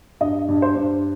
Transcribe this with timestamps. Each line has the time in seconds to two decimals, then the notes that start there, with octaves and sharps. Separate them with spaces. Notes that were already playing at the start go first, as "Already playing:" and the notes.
0.21 G2 D#5
0.48 G2
0.62 C5
0.76 G2